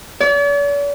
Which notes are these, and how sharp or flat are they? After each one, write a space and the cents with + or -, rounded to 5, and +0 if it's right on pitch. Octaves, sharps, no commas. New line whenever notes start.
D5 -45